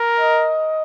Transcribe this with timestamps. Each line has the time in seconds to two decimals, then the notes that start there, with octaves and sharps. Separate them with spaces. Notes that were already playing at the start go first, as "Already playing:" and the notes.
Already playing: A#4
0.20 D#5